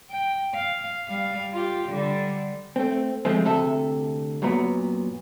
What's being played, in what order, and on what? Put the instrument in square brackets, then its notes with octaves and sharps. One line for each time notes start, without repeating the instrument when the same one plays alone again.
[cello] G5
F5
G3 F5
F4 G4
D3 G3
[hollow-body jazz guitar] A3 C4
F3 G#3 A3 C4
D2 C3 A4 E5
F#2 A#2 F#3 B3